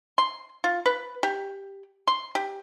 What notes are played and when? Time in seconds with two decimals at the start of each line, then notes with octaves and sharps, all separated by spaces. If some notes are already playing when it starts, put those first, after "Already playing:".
0.18 C6
0.64 F4
0.86 B4
1.23 G4
2.07 C6
2.35 G4